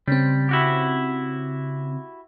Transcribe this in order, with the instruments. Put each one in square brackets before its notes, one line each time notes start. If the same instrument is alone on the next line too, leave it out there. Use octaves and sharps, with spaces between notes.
[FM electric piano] C#3 C4 [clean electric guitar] G3
[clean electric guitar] E4 F#4 G4